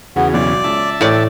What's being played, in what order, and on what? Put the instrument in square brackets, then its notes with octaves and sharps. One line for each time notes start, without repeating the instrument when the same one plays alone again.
[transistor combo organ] E2 C#3 [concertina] B3 [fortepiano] F#4 G#4
[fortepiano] B1 F#3 [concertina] D5
[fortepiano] C#2 [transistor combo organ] E5 A5
[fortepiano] A1 G5 [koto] A2 D5